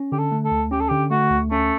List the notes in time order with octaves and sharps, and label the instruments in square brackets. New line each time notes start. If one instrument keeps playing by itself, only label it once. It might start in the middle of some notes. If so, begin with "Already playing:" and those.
Already playing: [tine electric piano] C#4
[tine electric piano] D3 [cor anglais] G4
[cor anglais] A4
[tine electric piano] A3
[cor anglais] A4
[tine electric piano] D2
[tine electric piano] C#4 [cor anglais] G4
[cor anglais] A4
[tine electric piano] D3 [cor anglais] G4
[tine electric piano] A3 [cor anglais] F#4
[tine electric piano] D2
[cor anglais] A3 [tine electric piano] C#4